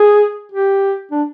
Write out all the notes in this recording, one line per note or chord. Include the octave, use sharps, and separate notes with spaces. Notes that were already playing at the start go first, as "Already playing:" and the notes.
Already playing: G#4
G4
D4